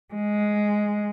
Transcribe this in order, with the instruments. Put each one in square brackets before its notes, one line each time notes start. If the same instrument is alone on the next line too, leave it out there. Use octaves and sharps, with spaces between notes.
[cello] G#3